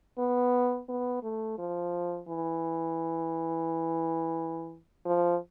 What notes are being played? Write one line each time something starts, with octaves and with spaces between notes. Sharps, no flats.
B3
B3
A3
F3
E3
F3